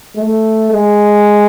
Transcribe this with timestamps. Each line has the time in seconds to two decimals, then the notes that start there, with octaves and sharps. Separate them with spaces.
0.16 A3
0.72 G#3